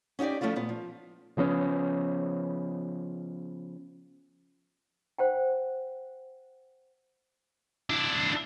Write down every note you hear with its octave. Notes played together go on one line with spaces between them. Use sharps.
C#4 D#4 F#4 G4 D5
F3 A3 C#4 E4 F4
A#2 B3
F3
C#3 F3 B3 C#4
C5 F#5 G5
D4 E4